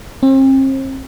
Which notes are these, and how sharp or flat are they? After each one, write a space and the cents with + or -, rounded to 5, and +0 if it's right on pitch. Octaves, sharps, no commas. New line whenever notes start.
C4 +40